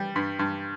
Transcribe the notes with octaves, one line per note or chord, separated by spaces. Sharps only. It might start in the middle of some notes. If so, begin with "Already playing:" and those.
Already playing: G3
G2
G2